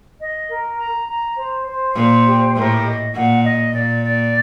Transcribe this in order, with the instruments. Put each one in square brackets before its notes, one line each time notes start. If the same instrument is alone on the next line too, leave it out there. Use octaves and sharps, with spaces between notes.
[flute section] D#5
A#4
A#5
A#5
C5
C5
[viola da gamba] A#2 [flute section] C5
[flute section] G4
[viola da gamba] A2 [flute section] A#4
[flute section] D#5
[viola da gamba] A#2 [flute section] F#5
[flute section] D#5
[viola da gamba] A#2 [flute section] D5
[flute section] D5